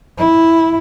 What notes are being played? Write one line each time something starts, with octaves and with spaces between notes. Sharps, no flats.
E4